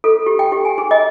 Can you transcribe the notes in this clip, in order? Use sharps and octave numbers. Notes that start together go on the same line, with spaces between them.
A4
G4
G5
G4
G#5
G#4
D#5